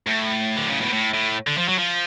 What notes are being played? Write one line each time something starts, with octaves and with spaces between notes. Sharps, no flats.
A2
D3
C#3
B2
A2
A2
D3
F3
F#3
F3